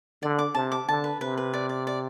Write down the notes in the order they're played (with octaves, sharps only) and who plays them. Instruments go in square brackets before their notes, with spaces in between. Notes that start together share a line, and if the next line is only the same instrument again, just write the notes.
[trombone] D3 [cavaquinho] D5
[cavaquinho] D6
[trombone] C3 [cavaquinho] A5
[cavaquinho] D6
[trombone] D3 [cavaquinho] A5
[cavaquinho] B4
[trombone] C3 [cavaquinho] B4
[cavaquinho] B4
D5
D5
D5